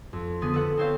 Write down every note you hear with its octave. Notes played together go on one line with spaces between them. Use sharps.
F2
D3 B3 G#4 D#7
A4 B4 F#5
C4 E4 C5 C#5 F5